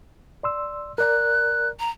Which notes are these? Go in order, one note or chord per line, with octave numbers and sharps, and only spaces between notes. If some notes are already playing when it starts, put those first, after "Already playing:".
D5 C6 E6
A#4 D5 A#5 F#6
A#5